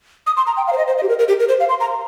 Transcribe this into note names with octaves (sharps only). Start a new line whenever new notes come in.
D#6
C6
A#5
G5
F5
C5
D#5
C5
D#5
G4
A#4
A#4
G4
A#4
C5
F5
C6
A#5